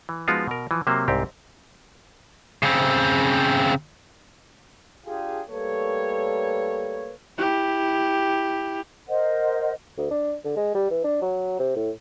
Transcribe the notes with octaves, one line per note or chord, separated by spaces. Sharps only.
E3
F3 G#3 B3 D#4 F4 F#4
B2 A#4
E3 F3
C3 F#3 A#3 C5
C2 G#2 C4 G4
C#3 C4
D4 F4 G4 G#4
G3 A3 A#3 A4 B4 C#5
E4 G4
A#4 C5 D#5 F#5
D2
D4
D3
G#3
G3
E3
D4
F#3
C3
A2